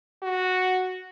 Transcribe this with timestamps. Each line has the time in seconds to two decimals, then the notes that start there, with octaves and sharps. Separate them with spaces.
0.23 F#4